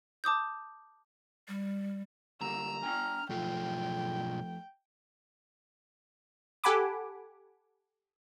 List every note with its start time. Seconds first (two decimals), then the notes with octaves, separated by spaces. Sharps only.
0.24 A5 D6 D#6 G6
1.48 G3
2.41 D3 G3 A#3 A#5 E6
2.83 D4 G5 G#5 F6
3.30 B1 F2 A3 F4 G5
6.64 G4 A4 F#5 G#5 B5 D6